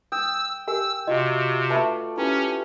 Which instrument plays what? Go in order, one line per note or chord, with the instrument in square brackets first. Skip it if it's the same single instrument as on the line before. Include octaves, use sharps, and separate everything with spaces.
[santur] G5 [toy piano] D#6 [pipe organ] E6
[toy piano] G4 A#4 G#5 [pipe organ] E6
[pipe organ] C3 [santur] F4 F#4 C#6 [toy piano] D#5
[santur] A3 A4 D5 [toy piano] B4 E5 B5
[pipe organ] C#4 [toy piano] E4 [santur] G4 B4 C#5